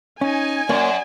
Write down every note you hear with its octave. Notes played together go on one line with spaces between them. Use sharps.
C#4 D#4 G#5
F#2 A#3 C#5 D5